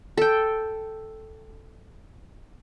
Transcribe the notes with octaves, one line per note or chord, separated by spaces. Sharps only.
A4 G5